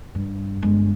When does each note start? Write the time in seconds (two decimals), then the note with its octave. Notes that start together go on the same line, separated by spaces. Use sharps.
0.15 G2
0.62 G1 G#3